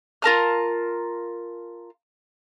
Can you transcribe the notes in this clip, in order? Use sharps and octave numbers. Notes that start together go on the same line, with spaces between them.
F4 A#4 A5 F6